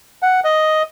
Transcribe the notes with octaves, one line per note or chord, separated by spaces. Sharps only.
F#5
D#5